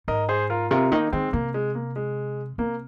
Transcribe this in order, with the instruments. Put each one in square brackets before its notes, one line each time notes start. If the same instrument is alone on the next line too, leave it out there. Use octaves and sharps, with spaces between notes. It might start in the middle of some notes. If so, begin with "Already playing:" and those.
[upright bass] G#2 [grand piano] A#4 D#5
[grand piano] G#4 C5
F4 A#4
[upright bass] C3 [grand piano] F4 A#4
[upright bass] D#3 [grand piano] A#3 D#4
[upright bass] D#3 [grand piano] G#3 C4
[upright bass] C3 [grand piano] A#3
[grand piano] G#3
A#3
G#3
[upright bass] C3 [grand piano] A#3